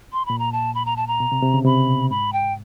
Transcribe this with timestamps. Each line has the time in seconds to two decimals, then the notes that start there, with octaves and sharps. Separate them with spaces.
0.13 C6
0.26 A#2 B5
0.39 A#5
0.52 A5
0.75 B5
0.85 A#5
0.97 A5
1.07 A#5
1.20 B2
1.32 C3
1.43 C3
1.54 C#3
1.65 C3 B5
1.88 B2
2.10 G#2 B5
2.33 G5